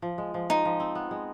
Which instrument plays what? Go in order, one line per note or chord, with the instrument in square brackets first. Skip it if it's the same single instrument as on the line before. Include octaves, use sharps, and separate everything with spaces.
[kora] F3
G#3
F3
[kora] G#3 [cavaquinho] D#4
[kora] F3
C4
B3
G#3